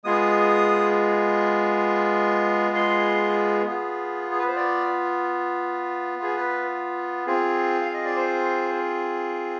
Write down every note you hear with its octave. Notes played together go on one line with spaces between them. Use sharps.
G#3 B3 F4 G#4 D#6
C6
B3 F4 G#4
G#4
B4
C5
D5
G#4
B4
C4 F4 G#4
F5
D#5
D5
C5